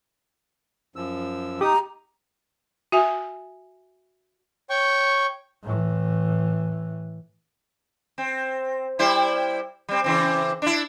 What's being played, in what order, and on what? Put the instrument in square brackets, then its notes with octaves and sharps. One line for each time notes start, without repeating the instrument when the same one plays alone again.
[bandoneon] F#2 F3 E6
[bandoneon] D#4 D#6 [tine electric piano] G4 [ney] A#5
[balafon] F#4 E5 G#5
[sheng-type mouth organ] C#5 G5 C#6
[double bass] A2 E3
[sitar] C4
G3 E4 C5
G3 C4
C#3 E3 C4
D4 E4